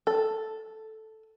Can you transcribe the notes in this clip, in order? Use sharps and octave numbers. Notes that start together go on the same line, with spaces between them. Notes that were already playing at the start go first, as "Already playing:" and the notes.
A4